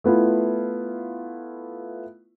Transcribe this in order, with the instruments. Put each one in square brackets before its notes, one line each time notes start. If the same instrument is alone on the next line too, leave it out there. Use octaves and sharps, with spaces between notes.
[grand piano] A3 B3 E4 F4